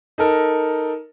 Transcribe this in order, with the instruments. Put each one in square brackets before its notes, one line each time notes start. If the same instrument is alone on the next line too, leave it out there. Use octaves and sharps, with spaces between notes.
[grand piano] D#4 A4 A#4